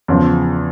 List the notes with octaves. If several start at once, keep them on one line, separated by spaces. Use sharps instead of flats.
E2 C#3 F3